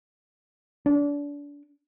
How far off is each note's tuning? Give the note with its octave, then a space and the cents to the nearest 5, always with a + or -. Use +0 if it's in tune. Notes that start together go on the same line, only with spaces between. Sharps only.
D4 -30